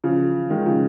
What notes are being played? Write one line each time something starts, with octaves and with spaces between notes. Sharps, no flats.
C#3 F3
D#3 G#3
C#3 F3